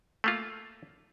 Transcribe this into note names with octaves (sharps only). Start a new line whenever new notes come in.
A3 A#3 F4